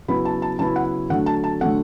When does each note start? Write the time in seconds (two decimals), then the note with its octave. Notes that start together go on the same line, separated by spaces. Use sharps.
0.08 C#3 F#3 B3 E4 B5
0.25 A5
0.42 A5
0.59 C#3 F#3 B3 E4 A5
0.76 F#5
1.10 D3 F#3 A3 F#5
1.26 A5
1.44 A5
1.61 D3 F#3 A3 F#5